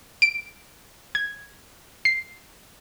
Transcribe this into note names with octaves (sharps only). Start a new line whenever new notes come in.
D7
G#6
C7